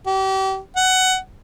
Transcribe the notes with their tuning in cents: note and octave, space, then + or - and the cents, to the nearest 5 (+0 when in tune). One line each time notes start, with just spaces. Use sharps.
G4 -35
F#5 +15